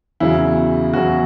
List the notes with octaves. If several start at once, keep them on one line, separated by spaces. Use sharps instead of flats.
E2 C#3 F#3 E4
E2 C#3 F#3 F#4